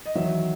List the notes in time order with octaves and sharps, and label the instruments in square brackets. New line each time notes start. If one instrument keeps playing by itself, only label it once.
[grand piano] D#5
E2 D#3 F#3 E5